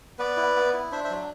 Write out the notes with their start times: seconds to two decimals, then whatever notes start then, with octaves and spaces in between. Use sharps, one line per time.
0.19 B3 B4 D5
0.37 E4
0.56 B3
0.73 E4
0.91 D4 C5 E5
1.04 C5 E5
1.10 F#3